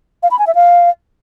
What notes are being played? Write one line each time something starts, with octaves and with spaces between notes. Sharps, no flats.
F5
B5
G#5
E5
F5